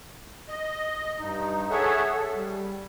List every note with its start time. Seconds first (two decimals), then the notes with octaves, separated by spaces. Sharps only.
0.49 D#5
1.20 G2 D#4
1.70 G#4 A4 C#5 E5 F#5
2.09 A4
2.35 G3